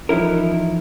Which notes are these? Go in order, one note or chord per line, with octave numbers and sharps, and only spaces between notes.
E3 F3 D#4 E4 A#4